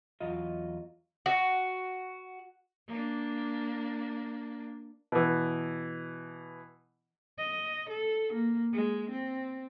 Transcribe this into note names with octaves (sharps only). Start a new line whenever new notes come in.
E2 F#3 F4 D#5
F#4
A#3 D4
B2 E3
D#5
A4
A#3
G#3
C4